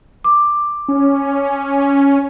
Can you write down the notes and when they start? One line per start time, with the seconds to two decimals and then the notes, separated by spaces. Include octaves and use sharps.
0.24 D6
0.88 C#4